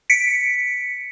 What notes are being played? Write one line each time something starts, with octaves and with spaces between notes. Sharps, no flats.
B6 C#7 D7